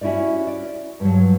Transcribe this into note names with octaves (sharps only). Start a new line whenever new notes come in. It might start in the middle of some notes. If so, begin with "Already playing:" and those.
C#4 E4 F#4 G4 D5
D5
G2 F3 F#3